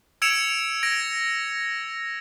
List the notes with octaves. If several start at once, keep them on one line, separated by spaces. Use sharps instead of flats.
E6 G#6 C#7 D7 E7 F7
G#6 A#6 D7